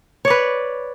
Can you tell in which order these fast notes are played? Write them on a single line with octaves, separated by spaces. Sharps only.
C#5 D5 B4